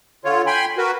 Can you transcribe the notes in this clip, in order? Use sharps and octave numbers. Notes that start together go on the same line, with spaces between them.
D3 F4 C#5
G5 G#5 B5 C6
F#4 A#4 B4